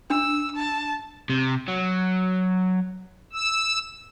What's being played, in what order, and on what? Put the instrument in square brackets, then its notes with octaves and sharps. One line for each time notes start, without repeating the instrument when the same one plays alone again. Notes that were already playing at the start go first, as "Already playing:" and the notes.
[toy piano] D4 [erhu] E6
[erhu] A5
[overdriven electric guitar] C3
F#3
[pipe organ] E6